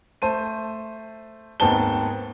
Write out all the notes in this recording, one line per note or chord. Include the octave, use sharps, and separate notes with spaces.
A3 C5 A5 D#7
D#2 G#2 B3 C4 A5 G7